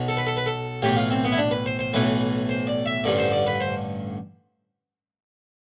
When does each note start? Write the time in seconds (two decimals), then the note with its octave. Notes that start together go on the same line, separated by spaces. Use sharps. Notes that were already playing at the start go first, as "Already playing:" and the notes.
Already playing: B1 B2
0.08 A4
0.17 B4
0.27 A4
0.37 B4
0.46 A4
0.82 B1 A2 E3 G4
0.96 F4
1.11 C4
1.24 B3
1.32 E4
1.37 D4
1.51 B4
1.66 C5
1.79 C5
1.93 B1 A2 E3 B4
2.49 C5
2.67 D5
2.86 E5
3.04 A1 G2 D3 D5
3.19 C5
3.32 D5
3.47 B4
3.60 C5